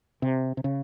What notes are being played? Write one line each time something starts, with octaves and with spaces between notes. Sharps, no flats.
C3
C3
C#3